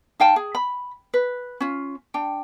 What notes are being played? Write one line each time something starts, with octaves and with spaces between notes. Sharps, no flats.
D#4 F5 G5 A5
G#4
B5
B4
C#4 F4
D4 G5